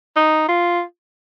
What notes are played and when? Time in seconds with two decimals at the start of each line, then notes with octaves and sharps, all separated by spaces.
0.16 D#4
0.49 F4